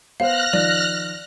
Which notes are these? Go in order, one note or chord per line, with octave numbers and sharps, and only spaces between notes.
B3 C5 F5 F6 F#6 A#6
D#3 F3 D5